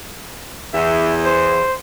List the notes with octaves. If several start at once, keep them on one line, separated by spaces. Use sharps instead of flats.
E2 E5
C5